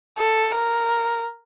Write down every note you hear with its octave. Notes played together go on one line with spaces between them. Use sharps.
A4
A#4